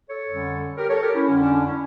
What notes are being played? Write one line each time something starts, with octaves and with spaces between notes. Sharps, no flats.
A4 C#5
F2 D3 G3 C#4
G4 A#4
A4 C#5
G4 A#4
C#4 E4
F2 D3 G3 C#4
D4
D4
C#4 E4